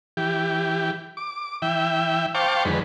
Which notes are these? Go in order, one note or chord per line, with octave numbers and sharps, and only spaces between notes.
E3 G4
D6
E3 E5 G5
C5 F5 G5 A5 C#6 D6
F2 D3 D#3 G#3 B4